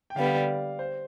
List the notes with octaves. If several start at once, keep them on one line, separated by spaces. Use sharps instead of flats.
G5
D3 G3 B3 F5
F5
D5
C5